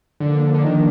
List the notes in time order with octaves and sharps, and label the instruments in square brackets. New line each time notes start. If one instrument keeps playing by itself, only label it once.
[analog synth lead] D3 [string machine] F3 A#3 D4
[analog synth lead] D3
D#3